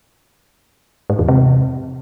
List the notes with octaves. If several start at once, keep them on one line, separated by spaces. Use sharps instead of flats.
G#2
E2
C3